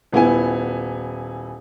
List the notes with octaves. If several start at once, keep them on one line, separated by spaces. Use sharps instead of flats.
D#1 B3 E4 G#5